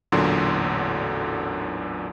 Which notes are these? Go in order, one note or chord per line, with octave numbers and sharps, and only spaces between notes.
A1 E2 A#2 D3 F#3 C6